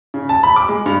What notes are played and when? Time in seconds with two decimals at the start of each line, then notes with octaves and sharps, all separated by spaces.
0.14 C#3
0.29 A5
0.43 B5
0.56 D6
0.69 G#3
0.86 G2